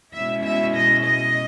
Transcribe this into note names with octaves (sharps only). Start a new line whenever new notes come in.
B2 G#3 C#4 E4 E5
E5
D#5
D#5